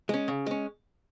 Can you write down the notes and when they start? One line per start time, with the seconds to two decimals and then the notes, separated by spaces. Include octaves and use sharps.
0.09 G#3 C#4
0.28 C#3
0.46 G#3 C#4